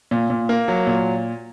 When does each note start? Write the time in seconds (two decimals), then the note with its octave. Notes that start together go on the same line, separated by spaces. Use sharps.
0.11 A#2
0.30 A#2
0.49 A#3
0.68 F#3
0.87 A#2